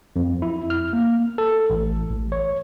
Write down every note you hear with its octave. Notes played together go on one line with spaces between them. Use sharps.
F2
E4
F6
A#3
A4
A1
A1
C#5